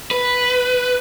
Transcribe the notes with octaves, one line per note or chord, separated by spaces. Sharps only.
B4